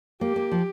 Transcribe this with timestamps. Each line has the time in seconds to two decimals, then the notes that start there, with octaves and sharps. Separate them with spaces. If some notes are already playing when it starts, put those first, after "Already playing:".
0.21 A#3 G4
0.36 A#3
0.52 F3